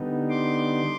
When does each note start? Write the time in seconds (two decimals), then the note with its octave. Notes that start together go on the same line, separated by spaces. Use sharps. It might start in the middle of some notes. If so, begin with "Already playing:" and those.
Already playing: D3 G3 B3 D#4
0.30 C6 D6